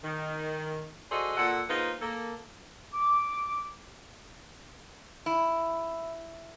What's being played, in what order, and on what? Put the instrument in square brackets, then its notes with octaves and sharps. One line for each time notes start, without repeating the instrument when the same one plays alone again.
[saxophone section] D#3
F#4 G#4 A4 C5 D5 D#5
A#2 A4 F#5
A#3 D#4 F4 G#4 B4 C5
A#3 A4
[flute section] D6
[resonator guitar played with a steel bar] E4